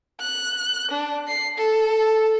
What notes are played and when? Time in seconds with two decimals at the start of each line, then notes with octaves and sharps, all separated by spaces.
0.20 F#6
0.91 D4
1.28 C7
1.57 A4